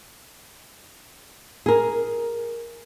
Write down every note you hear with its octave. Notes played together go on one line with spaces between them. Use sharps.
G#4 A#4